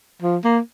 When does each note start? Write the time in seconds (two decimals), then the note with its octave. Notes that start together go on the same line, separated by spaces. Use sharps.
0.22 F3
0.44 A#3